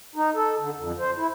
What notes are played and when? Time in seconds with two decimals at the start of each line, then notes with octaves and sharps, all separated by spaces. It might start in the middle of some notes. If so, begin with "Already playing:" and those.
0.16 D#4
0.35 A4
0.58 D3
0.77 F2
0.99 C5
1.17 E4